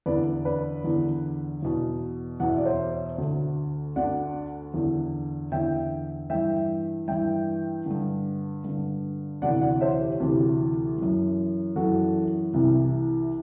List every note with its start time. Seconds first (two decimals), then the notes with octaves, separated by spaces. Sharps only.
0.06 E2 D3 B4 D5
0.45 B4 D5
0.84 E2 D3
1.62 E2 B2
2.40 E2 B2 F#5
2.49 E5
2.57 D5
2.65 C5 E5
3.18 D2 D3
3.96 D2 D3 D5 F#5
4.74 E2 D3
5.52 E2 D3 E5 G5
6.30 G2 E3 E5 G5
7.08 G2 E3 E5 G5
7.86 G2 D3
8.64 G2 D3
9.42 D2 C3 E3 D5 F#5
9.61 D5 F#5
9.81 C5 E5
10.01 G4
10.20 D2 C3 E3 G4
10.98 F#2 E3
11.76 F#2 E3 F#4 A4
12.53 C2 C3 E3